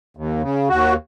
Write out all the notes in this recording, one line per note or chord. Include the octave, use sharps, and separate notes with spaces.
D#2
C#3
D#2 F#4